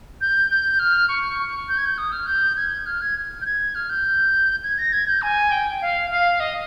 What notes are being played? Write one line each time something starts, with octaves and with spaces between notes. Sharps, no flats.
G6
G6
F6
C#6
C#6
G6
G#6
G6
D#6
F6
G6
G#6
F6
G#6
G6
G#6
F6
G6
G#6
A#6
G#6
G6
G#5
G5
F5
F5
D#5